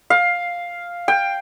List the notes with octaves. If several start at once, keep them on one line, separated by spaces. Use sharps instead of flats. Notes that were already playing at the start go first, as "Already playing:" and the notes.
F5
G5